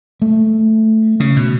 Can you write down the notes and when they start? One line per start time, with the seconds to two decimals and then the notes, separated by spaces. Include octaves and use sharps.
0.22 A3
1.20 C#3
1.36 B2